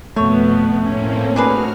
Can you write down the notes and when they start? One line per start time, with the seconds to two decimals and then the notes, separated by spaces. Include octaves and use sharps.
0.16 F2 B2 A3 B3 C#5
0.84 A2 A#3 C4 C#4
1.36 D4 F#4 G#4 B4 F6